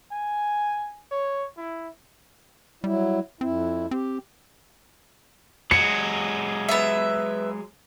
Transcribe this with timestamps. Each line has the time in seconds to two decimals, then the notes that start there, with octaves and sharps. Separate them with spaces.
0.12 G#5
1.11 C#5
1.57 E4
2.84 F#3 G3 E4
3.41 F2 C4 E4
3.91 C4 G4
5.71 F#3 G#3 C#7
6.69 B3 E5